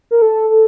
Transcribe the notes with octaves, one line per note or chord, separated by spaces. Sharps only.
A#4
A4
A4